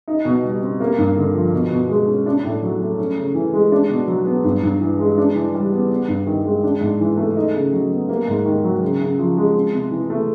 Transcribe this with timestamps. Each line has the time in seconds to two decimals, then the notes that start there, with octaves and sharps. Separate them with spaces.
0.08 D#4
0.25 B2
0.43 G3
0.62 C4
0.80 A#3
0.98 G2
1.17 D3
1.35 F3
1.53 B2
1.71 B2
1.89 G#3
2.07 C#4
2.26 D4
2.44 A2
2.63 F#3
2.80 A3
2.99 C#4
3.17 C#3
3.35 E3
3.53 G#3
3.72 D4
3.89 B2
4.07 F#3
4.26 B3
4.44 G2
4.63 G2
4.81 E3
4.99 G#3
5.18 D4
5.35 E3
5.54 G3
5.73 B3
5.91 B3
6.08 G2
6.27 D#3
6.45 G#3
6.64 D4
6.81 G#2
7.00 E3
7.17 A3
7.36 D#4
7.54 C#3
7.72 F#3
7.90 B3
8.09 A#3
8.28 G#2
8.45 D#3
8.64 F#3
8.82 C#3
8.99 C#3
9.19 F3
9.37 G#3
9.54 C4
9.73 C3
9.91 E3
10.10 A3